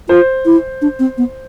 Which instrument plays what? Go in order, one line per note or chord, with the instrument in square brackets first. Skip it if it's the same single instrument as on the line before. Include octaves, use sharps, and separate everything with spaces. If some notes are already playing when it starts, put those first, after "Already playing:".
[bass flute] F4 [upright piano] C5
[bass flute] E4
D4
C4
B3